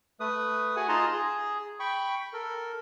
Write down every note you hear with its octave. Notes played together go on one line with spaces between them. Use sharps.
A3 B4 D#6
F#4 G#4 F#5 G#5
D#4 F4 G#4 A5 A#5 C6
G#4
G5 B5 C#6
A4 A#4